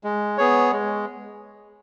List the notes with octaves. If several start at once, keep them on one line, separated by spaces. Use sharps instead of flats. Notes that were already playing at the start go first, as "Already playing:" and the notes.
G#3
B3 G#4 C#5
G#3